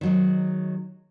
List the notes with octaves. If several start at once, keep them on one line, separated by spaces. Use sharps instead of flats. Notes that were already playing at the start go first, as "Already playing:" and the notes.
D#3 F#3 G#3